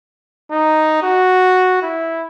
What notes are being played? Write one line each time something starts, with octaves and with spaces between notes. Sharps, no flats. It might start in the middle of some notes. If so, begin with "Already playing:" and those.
D#4
F#4
E4